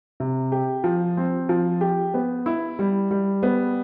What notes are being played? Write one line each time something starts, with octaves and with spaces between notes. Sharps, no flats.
C3
G4
F3
C4
F3
G4
B3
E4
G3
G3
B3